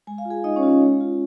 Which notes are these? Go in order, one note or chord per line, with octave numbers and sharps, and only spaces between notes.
G#3 G#5
F5
F4
G#4 G#5
G#3 D#4 D#5
C#4 C#5
F4
C#4 C#5
G#3
F4